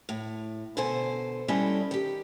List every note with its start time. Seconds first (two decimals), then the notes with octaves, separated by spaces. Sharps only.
0.09 A2
0.77 B2 D3 A4 C5 G#5
1.48 G3 C#4 D4 E4 A4 D#5
1.91 D#3 G4